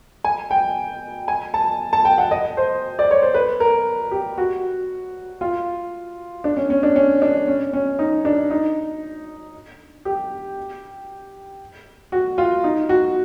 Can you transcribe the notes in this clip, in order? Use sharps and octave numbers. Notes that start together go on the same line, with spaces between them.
G#5
G5
G#5
A5
A5
G5
F#5
D#5
C5
D5
C#5
C5
B4
A#4
G4
F#4
F4
D4
C#4
C#4
D4
C#4
D4
C#4
C#4
D#4
D4
D#4
G4
F#4
F4
D#4
F#4